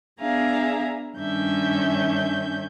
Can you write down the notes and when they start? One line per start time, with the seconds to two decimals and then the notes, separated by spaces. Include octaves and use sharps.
0.19 B3 D4 G#4 E5 F5 A#5
1.16 G2 D#3 C#4 D4 E5 G6